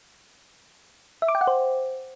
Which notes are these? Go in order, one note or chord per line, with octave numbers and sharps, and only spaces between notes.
E5
D6
G5
F#5
C5